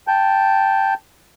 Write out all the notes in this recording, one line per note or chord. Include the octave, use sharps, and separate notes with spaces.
G5 A5 G6